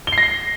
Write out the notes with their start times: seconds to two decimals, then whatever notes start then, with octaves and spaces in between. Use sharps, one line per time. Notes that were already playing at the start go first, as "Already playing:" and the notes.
0.07 G7
0.12 C7
0.18 A#6
0.23 C7